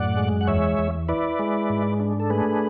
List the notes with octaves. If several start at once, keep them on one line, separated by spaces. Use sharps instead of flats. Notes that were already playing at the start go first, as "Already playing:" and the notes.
Already playing: F#2 A2 D5 F#5
G#3
F#5
E2 C#5 E5
E2
E4 B4 D5
G#3
G#2
D4
A4
A3 G#4 B4